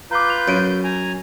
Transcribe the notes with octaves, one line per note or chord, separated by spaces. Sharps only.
F4 B4 A#5 D6 G6
F7
F#2 G#6 D7 D#7
G#5 A#5